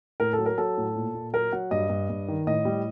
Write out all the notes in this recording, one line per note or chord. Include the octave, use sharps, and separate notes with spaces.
A2 A#4
A4
F#3
A#4
F#3 A4
A2
A#2
A#2
F#3 A#4
F#3 F#5
G2 D#5
G2
G2
D#3
A2 D#5
G3